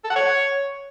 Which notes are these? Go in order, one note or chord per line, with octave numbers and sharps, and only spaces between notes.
A4
F#5
C#5